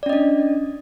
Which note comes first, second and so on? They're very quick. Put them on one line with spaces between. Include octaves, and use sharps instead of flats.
D5 C#4 D#5 D4